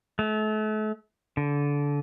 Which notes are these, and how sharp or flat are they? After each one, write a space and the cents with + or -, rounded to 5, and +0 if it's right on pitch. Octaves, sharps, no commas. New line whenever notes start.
A3 -35
D3 -25